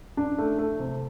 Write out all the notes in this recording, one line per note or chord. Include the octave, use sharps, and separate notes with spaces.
D4
A3
A3
C3